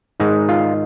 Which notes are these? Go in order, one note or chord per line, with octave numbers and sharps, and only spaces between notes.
G#2 D#3 G#3 D#4
F4